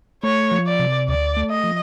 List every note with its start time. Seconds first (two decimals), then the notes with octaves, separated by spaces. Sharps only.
0.23 A3 C#5
0.51 F3
0.66 D5
0.79 C3
1.08 D2 D5
1.37 A3
1.50 D#5
1.64 F3